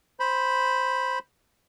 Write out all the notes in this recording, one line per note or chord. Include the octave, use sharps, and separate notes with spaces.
C5 B5